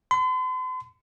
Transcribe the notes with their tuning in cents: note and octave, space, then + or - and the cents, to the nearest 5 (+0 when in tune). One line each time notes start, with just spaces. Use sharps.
C6 -45